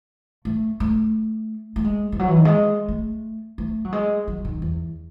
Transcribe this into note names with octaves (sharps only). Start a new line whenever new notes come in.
A3
A3
A3
G#3
E3
F#3
E3
D#3
G#3
A3
A3
F#3
G#3
F#3
D#3
E2